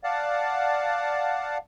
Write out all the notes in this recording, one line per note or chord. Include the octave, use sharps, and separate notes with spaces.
D5 F5 F#5 A5